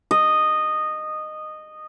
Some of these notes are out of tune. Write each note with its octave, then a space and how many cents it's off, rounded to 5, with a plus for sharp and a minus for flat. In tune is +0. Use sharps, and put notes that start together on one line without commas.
D#5 -15